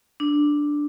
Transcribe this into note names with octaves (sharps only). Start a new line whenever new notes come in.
D4